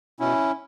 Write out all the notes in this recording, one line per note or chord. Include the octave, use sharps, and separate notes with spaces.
B2 C#4 E4